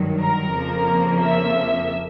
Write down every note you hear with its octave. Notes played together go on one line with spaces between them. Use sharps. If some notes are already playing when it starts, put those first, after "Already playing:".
Already playing: G2 D#3 F#3
A#4
F2 C#3 F3 A#3
E5